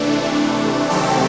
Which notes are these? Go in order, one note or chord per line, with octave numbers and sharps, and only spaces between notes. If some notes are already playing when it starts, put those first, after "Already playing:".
Already playing: C3 E3 A3 D4
C3 D#3 F#3 A3 C4 G4 A4